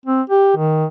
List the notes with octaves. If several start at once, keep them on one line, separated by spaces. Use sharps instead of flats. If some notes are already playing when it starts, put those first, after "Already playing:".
C4
G4
D#3